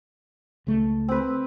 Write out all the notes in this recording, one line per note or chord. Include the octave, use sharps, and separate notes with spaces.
C#2 A3
C4 B4